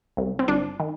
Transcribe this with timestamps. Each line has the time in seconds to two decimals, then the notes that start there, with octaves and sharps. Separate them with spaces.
0.17 C2
0.39 C4
0.48 G1 D4
0.80 D#3